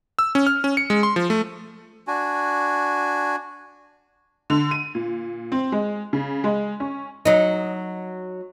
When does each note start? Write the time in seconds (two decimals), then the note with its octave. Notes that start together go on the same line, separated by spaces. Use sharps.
0.19 E6
0.35 C#4
0.47 F6
0.64 C#4
0.77 C#7
0.90 G#3
1.03 C6
1.16 F3
1.30 A3
2.07 D4 F#4 G#5
4.50 D3
4.71 D#7
4.95 A#2
5.52 C4
5.72 G#3
6.13 C#3
6.44 G#3
6.80 C#4
7.25 F#3 D#4